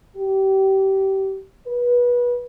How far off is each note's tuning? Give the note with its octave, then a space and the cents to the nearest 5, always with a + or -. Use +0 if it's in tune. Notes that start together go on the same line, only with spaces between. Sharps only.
G4 -25
B4 -25